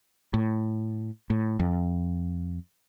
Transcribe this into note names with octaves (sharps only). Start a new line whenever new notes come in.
A2
A2
F2